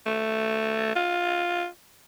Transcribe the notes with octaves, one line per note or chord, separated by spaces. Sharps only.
A3
F4